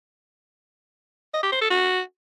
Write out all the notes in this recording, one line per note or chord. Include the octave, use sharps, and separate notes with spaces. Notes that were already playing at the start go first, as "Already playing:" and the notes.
D#5
G4
C5
A4
F#4